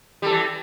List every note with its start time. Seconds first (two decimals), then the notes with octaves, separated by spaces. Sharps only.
0.22 G3
0.26 A4
0.30 E3